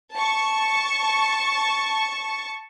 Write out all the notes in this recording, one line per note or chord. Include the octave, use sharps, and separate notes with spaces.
A5 C#6